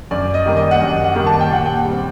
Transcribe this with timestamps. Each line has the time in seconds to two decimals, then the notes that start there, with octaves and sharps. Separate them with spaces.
0.11 F#2 D5
0.34 D#5
0.46 D#3 G3 A#3
0.57 D#5
0.71 F#5
0.80 F#2 D#5
1.04 F#5
1.15 D#3 G3 A#3
1.26 A5
1.41 G5
1.51 A#2 F#5
1.66 G5
1.85 G3 C4